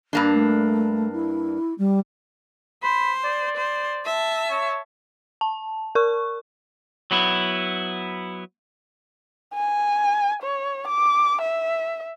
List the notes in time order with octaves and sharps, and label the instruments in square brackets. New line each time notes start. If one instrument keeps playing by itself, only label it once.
[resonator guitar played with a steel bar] G2 A#3 D4
[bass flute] A3
E4
G3
[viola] C5 [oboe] B5
[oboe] D5
[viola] C5
E5 A5
[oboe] C#5
[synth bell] A5
A#4 C#6
[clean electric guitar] F#3 B3 E4
[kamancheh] G#5
C#5
D6
E5